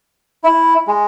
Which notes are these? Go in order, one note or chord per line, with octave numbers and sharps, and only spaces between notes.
E4
G#3